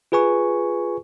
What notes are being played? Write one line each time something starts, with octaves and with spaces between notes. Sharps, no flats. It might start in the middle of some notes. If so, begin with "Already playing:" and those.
F4 G#4 B4 G#5 C#6